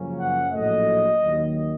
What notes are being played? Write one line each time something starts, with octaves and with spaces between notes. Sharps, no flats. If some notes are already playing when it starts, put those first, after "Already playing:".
Already playing: F#2 C#3 F3 A#3 C#4
F#5
A#1 A2 F#3 A3 D#5
D#2 D#3 F#3